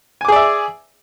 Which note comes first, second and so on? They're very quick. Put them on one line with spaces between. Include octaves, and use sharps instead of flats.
G#5 D6 G#4 D5 E5